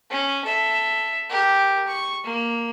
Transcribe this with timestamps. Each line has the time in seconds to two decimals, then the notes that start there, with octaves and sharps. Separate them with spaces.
0.11 C#4
0.45 A4 E5
1.30 G4 A#4
1.88 C#6
2.24 A#3